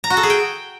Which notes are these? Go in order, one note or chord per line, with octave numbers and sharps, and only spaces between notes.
A#5
F#4
A4
G#4
G5